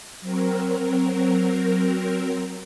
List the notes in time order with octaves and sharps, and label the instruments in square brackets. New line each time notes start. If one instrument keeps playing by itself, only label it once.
[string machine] F#3 C4 A#4